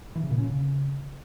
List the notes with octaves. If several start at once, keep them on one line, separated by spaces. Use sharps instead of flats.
E3
C#3
A#2
C#4
C#3